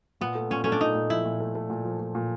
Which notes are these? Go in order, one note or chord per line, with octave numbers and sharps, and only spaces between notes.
A#2 B3
A3
A#2 C#4
A3 C#4
D4
A#2 D#4
A#2
F3 E4
A#2
A3
A3
A#2
F3
A#2
A#2